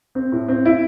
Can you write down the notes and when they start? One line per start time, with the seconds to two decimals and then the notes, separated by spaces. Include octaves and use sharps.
0.15 C4
0.32 A2
0.48 C4
0.65 E4